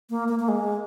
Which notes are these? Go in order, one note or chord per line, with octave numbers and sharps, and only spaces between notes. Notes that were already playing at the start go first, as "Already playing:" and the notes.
A#3
A#3
A#3
G#3